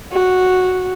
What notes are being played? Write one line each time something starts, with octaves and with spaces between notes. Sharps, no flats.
F#4